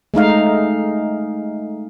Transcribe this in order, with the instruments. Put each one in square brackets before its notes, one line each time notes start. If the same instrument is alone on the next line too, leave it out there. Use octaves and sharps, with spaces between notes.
[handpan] G#3 A3 D#4 F5